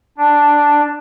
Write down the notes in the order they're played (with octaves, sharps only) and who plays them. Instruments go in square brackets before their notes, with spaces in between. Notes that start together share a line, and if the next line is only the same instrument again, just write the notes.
[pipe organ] D4